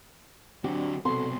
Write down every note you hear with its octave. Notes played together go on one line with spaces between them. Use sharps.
D3 F#3 C4 D4 F#4 G4
C2 B2 C4 F#4 A4 C6